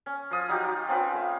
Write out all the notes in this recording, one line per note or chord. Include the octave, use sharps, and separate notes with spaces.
C#4
F3 F4 D#6
F#3 D#4 F4 G4
D#4
C4 C#4 F4 B4
A3